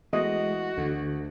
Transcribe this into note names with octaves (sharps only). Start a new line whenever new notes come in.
E3 G#3 A3 B3 F#4 D#5
D2 D3